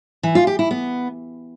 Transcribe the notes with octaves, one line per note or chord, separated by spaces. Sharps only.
E3
F4
G4
E4
B3